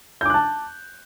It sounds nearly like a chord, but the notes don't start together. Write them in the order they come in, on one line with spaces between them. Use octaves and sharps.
G6 D6 F#6 A5